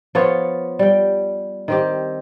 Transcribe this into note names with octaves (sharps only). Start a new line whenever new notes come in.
F3 B3 F4 C#5
G3 G5
D#3 C4 G4